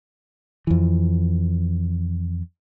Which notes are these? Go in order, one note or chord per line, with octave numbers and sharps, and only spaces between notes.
F2 E3